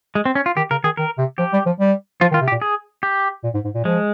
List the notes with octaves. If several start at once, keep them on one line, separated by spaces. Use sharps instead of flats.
G#3
C4
C#4
F4
D#3 G4
C#3 A#4
D#3 G#4
D#3 A#4
C3
F3 G4
G3
F3
G3
F3 F4
D#3
F4
C3
G4
A#2
G#4
G4
A#2
G#2
G#2
A#2
F3 G#3